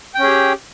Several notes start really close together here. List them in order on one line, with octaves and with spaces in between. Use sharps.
G5 C#4 G#4 G4